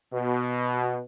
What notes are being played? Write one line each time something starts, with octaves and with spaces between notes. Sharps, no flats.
B2